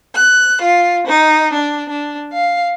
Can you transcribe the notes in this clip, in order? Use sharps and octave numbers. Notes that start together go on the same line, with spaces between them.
F#6
F4
D#4
D4
D4
F5